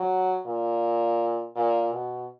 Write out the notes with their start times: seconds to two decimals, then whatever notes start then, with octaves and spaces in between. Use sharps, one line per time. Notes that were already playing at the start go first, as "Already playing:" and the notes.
Already playing: F#3
0.46 A#2
1.56 A#2
1.92 B2